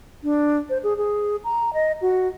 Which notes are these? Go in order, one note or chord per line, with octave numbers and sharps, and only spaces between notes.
D4
C5
G#4
G#4
A#5
D#5
F#4